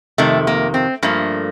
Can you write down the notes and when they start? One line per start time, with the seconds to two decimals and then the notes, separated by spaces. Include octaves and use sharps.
0.18 F2 C3 D#3 A3
0.47 A#3
0.74 C4
1.03 G2 F3 A3 A#3